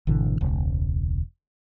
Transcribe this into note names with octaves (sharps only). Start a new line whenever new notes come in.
G#1 B2 D3 E3
E1 C#2